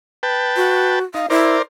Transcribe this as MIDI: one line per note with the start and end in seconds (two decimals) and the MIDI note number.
0.23 0.99 71
0.23 0.99 79
0.23 0.99 81
0.56 1.03 66
1.14 1.26 63
1.14 1.30 77
1.30 1.57 64
1.30 1.62 70
1.30 1.62 72
1.30 1.62 74